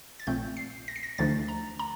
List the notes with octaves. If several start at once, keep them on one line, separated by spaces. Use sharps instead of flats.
A6
A#1 A#2 A3 C4 G6
C7
A#6
C7
A#6
D2 D3 F3 A3 D4 A6
A#5
A#5